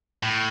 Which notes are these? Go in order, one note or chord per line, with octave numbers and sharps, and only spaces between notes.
A2